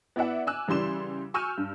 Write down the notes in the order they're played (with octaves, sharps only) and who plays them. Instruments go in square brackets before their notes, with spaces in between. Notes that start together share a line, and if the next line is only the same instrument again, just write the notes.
[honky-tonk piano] B3 E4 D5 E5 F#5
G#5 D6 E6 F#6
C#3 E3 G3 C6 E7
G#5 C#6 E6 F6 G6 D#7
G2